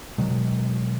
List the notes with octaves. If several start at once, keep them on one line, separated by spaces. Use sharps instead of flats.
B2 D#3 F#3 G#3